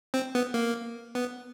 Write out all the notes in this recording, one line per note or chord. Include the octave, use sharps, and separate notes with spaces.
C4
B3
A#3
B3